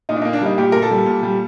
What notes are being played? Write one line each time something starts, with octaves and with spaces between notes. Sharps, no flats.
A#2 D#4
D4
A#3 D#4
D4
G3 D#4
A#2 G4
A#2 A#4
A4
G3
A#2
G3